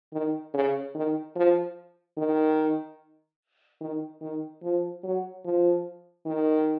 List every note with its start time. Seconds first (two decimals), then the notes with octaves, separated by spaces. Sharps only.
0.13 D#3
0.54 C#3
0.95 D#3
1.36 F3
2.18 D#3
3.81 D#3
4.21 D#3
4.63 F3
5.04 F#3
5.45 F3
6.26 D#3